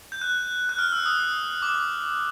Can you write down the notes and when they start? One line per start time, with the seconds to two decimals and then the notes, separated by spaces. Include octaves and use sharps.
0.12 G6
0.21 F#6
0.69 F#6
0.78 F6
0.92 E6
1.06 D#6
1.62 D6